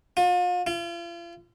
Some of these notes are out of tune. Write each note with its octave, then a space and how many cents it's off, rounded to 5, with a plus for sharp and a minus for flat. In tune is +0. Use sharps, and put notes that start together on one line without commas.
F4 +40
F4 -40